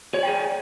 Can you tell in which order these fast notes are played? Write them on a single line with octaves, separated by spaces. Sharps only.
C#5 D5 G5 G#4